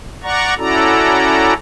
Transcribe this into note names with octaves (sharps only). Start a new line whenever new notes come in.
D5 F#5 A#5 C#6
C#4 E4 F#4 A4 D5 A#5